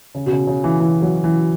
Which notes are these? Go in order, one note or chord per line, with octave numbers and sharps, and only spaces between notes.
C#3
B2
C#3
C#3
E3
E3
F#3
E3